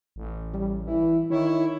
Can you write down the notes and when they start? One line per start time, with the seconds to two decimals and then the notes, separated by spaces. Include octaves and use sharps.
0.16 A1
0.54 G3
0.86 E3 E4
1.30 D#3 E4 C#5